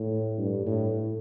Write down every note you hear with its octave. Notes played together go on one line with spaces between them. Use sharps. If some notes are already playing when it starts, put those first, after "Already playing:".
Already playing: A2
G2
A2